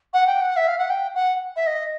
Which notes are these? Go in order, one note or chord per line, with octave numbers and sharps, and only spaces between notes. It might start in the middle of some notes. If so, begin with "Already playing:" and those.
F#5
G5
F#5
E5
F5
F#5
G5
F#5
E5
D#5